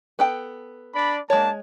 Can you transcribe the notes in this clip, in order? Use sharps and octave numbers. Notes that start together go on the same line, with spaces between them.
B3 A4 G5
D4 D5 B5
G#3 A#3 D4 C#5 A5